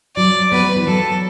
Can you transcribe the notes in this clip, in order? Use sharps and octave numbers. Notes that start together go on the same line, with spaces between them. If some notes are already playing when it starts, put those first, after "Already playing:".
F#3 D5
B3 B4
F#3
E3
F#3 A4